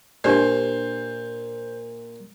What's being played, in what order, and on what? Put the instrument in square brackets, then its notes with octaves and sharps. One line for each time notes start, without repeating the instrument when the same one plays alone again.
[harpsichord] A#2 [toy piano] D4 G4 D5 [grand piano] C5